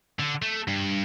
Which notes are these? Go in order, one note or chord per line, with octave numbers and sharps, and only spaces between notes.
D3
A3
G2